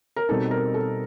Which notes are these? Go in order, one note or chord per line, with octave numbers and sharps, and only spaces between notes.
A#4
B2 G3 C4 D#4 A4
A#4
A4